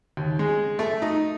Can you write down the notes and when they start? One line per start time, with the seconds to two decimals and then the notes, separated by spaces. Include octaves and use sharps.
0.17 D#2
0.39 G#3
0.79 A3
1.02 D#4